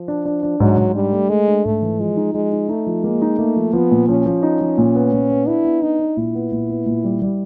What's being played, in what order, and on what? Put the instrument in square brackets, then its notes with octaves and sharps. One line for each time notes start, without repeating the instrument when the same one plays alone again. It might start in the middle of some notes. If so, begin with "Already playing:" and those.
Already playing: [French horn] F3
[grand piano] D4
D4
D4
[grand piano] G#2 [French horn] F#3
[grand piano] G#2
[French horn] G3 [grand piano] D4
[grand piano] A3
[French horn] G#3 [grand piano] A3
[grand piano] D4
[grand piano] G#2 [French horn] A3
[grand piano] E3
[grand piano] F3 [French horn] G#3
[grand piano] D#4
[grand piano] F3 [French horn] G#3
[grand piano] D#4
[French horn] A3 [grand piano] D#4
[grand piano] F3
[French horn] G#3 [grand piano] A#3
[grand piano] D#4
[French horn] A3 [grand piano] A#3
[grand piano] F3
[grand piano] F3 [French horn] B3
[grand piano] A#2
[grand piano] F3 [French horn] C#4
[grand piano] F3
D#4
F3
A#2
B3
A#2
B3
[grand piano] D4 [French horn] E4
[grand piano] B3
[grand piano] D4 [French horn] D#4
[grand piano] D4
[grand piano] A#2 [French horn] E4
[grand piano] B3
A#2
B3
A#2
G3
G3